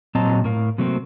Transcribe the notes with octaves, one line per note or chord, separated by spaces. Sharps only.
A#2 F#3 C4 D#5 A5 A#5
A2 A#4 F5
C3 F#3 A3 A#3 C4